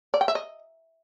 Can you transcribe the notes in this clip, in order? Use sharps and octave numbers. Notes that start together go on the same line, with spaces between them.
D5
G5
E5
D#5